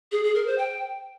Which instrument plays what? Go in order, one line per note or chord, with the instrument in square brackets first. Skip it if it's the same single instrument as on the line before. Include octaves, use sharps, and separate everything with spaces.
[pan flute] G#4
G#4
A#4
C5
G5